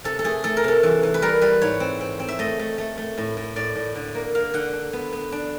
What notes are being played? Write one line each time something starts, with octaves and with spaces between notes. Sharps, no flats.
C3 A4
A4
A3 G#4
A3 A4
A#4
C3 A4
E3
E3
B4
G3 A#4
G3 B4
G#2 C#5
C4
C4
C4
E5
A3 D#5
A3
A3
A3
A2
A2
A2 D5
A2
D3
A#3
A#3 F5
D3 F#5
D4
B3
B3
D4